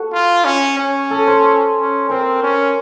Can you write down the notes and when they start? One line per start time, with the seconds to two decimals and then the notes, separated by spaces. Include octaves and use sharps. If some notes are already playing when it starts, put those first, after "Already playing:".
Already playing: F#4 A4
0.13 F4
0.45 C#4
0.78 C#4
1.11 A4
1.27 C5
1.76 C#4
2.09 C4 A#4
2.43 C#4